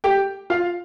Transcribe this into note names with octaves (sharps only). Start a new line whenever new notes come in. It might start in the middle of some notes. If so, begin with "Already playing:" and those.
G4 G5
F4 F5